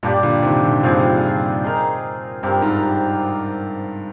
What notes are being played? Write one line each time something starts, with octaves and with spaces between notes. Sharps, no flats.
G2 A#2 D4 G4 D5
A#2 D3
C3 D#3
A#2 D3
G2 A#2 C4 F4 G#4 C5
G#3 D#4 A#4
G2 C4 G4 A#4
G#2